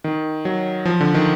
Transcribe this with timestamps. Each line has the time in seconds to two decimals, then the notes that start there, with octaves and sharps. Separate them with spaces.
0.04 D#3
0.45 F#3
0.85 F3
1.01 D3
1.14 D#3